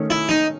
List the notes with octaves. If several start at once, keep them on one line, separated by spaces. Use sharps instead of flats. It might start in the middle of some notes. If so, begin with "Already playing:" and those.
Already playing: D#3 A3 C#4
E4
D#4